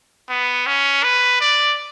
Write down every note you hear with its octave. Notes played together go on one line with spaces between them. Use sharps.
B3
C#4
B4
D5